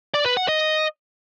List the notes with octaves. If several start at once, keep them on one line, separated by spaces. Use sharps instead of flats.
D5
B4
F#5
D#5